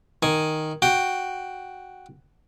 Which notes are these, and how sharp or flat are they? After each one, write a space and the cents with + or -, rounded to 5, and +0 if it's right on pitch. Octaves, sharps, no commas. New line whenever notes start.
D#3 +0 G#5 +0
F#4 +0 G5 +0